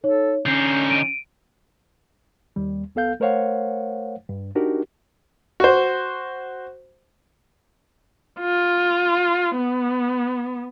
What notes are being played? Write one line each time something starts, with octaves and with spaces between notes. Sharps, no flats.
D#4 A4 C#5
D3 C#4 D#4 G6 C7
D7 D#7
D#2 G3
C2 B3 A4 F5 G6
A3 A#4 C5 C#5 F5 F#5
G2
D4 D#4 F#4 G4 A#4
F#4 C5
F4
B3